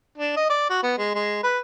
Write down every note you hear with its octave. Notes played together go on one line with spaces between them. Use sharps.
D4
D#5
D5
F#4
B3
G#3
G#3
B4